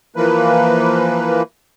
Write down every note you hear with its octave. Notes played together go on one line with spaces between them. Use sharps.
E3 F3 A#3 B4